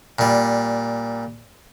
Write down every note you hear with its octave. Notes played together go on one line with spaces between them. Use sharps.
A#2 G3